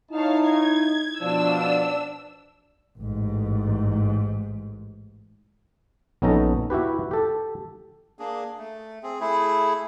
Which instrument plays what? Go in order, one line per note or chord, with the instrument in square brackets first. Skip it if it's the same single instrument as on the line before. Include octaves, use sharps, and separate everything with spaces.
[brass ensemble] D#4 E4 [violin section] C#5 F5 A5
[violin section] G#6
[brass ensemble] B2 F3 [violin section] D4 E6
[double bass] A1 G#2
[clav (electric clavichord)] A#1 B3 C#4 D#4 A4 A#5
E4 F#4 G4 B4
G4 A4
[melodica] A#3 D4 G#4
A3
C4 G#4
A3 E4 G#4